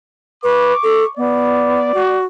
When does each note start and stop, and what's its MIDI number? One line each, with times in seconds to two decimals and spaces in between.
0.43 0.73 71
0.43 1.11 85
0.43 1.11 86
0.83 1.04 69
1.17 1.92 59
1.17 2.24 74
1.94 2.25 66